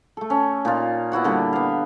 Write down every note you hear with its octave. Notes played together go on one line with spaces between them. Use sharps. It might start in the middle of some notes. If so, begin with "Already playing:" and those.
A3 A4
C#4
A#2 D#4 F4
B3 E4 F#4 F#5
A#2 D3 G3
B3 F5